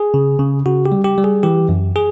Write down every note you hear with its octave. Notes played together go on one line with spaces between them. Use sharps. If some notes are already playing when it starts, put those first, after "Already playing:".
Already playing: G#4
C#3
C#3
C#3 F#4
G4
G3
G4
G3
G#4
E3 G4
F#2
G#4